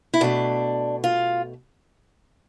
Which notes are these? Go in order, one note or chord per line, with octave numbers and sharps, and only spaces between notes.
E4
B2 A3 D4
F4